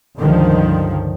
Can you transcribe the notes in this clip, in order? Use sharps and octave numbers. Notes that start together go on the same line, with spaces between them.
C#2 G2 D3 D#3 F3 G3